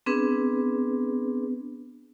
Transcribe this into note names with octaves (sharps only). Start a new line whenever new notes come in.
B3 C4 D4 G#4 B4